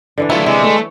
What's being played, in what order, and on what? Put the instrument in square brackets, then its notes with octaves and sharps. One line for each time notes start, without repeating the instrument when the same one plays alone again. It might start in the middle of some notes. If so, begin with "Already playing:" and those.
[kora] D3 E3 D4
[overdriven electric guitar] F#3 A3 [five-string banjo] E4 F4
[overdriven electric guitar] C3 [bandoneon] G#3 [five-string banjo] E4
[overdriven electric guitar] A3 [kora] C#5